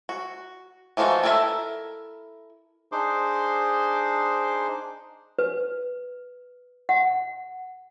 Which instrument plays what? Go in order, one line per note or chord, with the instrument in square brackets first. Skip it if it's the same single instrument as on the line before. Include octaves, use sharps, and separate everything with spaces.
[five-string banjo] F#4
E3 F3 D#4 F4 F#4
E4 A4 A#4 D5 E5
[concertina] D4 D#4 G#4 C5 C6 D6
[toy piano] B4
F#5